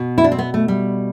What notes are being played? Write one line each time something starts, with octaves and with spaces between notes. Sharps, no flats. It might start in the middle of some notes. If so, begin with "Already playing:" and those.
Already playing: B2
E4
D4
C4
B3
A3
G3